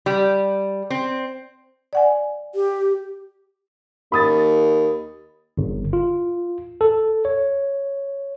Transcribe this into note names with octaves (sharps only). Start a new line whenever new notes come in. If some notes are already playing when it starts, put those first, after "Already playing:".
G3
C4
D5 F#5 G#5
G4
D#2 B5 D#6 A6
G1
F4
A4
C#5